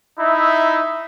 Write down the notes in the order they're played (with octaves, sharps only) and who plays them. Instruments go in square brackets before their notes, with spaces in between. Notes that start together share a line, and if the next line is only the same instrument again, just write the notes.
[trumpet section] D#4 E4 E5